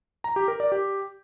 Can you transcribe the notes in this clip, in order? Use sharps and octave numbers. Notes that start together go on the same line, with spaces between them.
A#5
G4
A#4
D5
G4